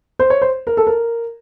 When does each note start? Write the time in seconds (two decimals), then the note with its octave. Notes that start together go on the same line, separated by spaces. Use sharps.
0.19 C5
0.30 C#5
0.41 C5
0.67 A#4
0.77 A4
0.87 A#4